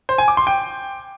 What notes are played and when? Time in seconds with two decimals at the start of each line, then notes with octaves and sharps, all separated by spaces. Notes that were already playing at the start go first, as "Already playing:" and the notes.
0.09 C5
0.18 G#5
0.28 D6
0.37 C6
0.47 G5